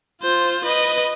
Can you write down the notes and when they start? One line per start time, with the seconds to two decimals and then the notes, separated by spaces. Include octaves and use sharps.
0.22 F4 C5
0.65 B4 D#5